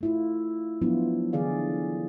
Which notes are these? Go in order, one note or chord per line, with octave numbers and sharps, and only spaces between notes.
A3 E4 F4
F3 F#3 B3 D4 E4 F4
D3 E3 G#4 D5 F5